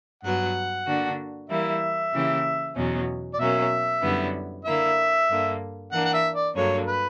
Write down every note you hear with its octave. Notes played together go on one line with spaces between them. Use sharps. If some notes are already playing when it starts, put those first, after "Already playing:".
G2 F#3 B3 F#5
D3 A#3 D4 F#4
E3 G3 A#3 E4 E5
C#3 E3 A#3 E4 G4
E2 B2 F#3 C#4
D5
B2 F#3 A#3 C#4 E5
F#2 D3 G3 B3 E4
D3 A#3 E4 E5
G2 D3 A#3
E3 A#3 D4 F#5
F#5
E5
D5
G2 D3 F#3 A#3 C#5
B4